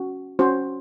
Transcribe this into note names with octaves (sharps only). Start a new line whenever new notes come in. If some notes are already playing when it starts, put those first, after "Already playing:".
Already playing: C#4 F#4
C#4 F#4 C5